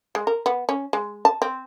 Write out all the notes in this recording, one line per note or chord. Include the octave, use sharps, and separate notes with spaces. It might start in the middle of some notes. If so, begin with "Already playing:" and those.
G#3
A#4
B3
C#4
G#3
A5
C4